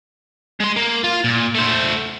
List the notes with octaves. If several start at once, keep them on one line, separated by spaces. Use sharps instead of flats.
G#3 C6
A#3
F4
A#2
A3 C5